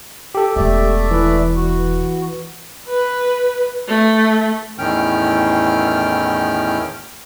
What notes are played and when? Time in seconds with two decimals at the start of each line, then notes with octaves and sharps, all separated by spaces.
0.35 G4 A4
0.56 E1 E2 A3 D5 E5
1.11 E3 B4
1.56 F#4
2.88 B4
3.88 A3
4.79 E2 A2 D#3 C#4 G5 F6